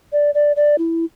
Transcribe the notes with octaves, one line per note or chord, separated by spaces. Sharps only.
D5
D5
D5
E4